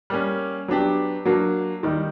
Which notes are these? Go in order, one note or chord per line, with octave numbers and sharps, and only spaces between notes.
G3 A#3 C#4
F#3 B3 D4 G4
F#3 A#3 D4
D#3 G3 A#3 D#4